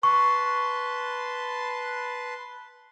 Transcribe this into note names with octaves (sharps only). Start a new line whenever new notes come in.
B4 A5 C6 C#6